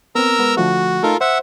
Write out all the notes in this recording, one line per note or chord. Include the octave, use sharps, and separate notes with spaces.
B3 C4 A#4 A#5 E6
G#3 B3
D3 F3 A3 F#4
A3 D#4 F4 A4 A#4
C5 E5 F#5